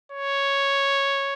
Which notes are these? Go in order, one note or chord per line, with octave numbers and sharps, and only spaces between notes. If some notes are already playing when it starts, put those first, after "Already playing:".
C#5